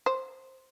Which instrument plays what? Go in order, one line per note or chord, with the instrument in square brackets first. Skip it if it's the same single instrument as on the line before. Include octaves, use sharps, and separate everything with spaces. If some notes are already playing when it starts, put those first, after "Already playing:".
[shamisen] C5